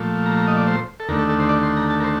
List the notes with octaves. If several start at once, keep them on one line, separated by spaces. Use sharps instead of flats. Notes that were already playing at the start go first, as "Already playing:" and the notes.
Already playing: A#2 F3 A3
A#5
A#5
D#5
D5
C5
A4
D#2 D3 A3 A#4
A4
A4
C5
D5
C6
A#5
A5
A#4
C5